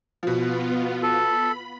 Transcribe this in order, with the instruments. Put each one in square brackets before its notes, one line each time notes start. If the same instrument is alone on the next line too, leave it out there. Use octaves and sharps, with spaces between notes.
[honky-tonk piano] B2 F3 [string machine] B3 F4
[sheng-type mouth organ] A4 [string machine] B5